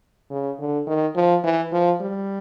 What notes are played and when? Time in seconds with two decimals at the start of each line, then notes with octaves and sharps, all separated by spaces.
0.31 C#3
0.59 D3
0.86 D#3
1.16 F3
1.44 E3
1.72 F3
2.01 G3